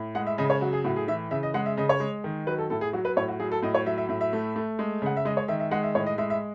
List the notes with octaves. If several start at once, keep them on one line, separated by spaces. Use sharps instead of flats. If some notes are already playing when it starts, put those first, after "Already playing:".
Already playing: A2
G#3 F#5
E5
C#3 D#5
C#5
F#3 F#4
G#4
A2 F#4
G#4
E3 E5
C#3 E5
D#5
G#3 F#5
E5
C#3 D#5
C#5
G#3
D#3
F#3 B4
A4
A2 A4
G#4
F#3 F#4
B4
A2 C#5
F#4
F#3 G#4
A4
A2 D#5
C#5
F#3 E5
E5
A2 E5
E5
A3
A3
G#3
C#3 F#5
E5
G#3 D#5
C#5
D#3 E5
E5
G#3 F#5
E5
A2 C#5
D#5
G#3 E5
E5